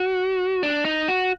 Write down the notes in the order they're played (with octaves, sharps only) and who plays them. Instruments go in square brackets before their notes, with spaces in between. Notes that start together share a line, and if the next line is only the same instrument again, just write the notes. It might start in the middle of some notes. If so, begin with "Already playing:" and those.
Already playing: [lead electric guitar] F#4
D4
D#4
F#4